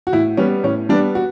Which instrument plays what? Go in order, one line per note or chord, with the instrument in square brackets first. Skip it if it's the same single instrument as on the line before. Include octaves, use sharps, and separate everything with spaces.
[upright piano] F#4
A2 E4
G3 B3 C#4
A2 C#4
G3 B3 D4
F#4